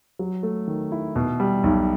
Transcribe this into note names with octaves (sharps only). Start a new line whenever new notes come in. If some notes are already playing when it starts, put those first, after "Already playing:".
F#3
A3
D#3
E4
B2
G3
B1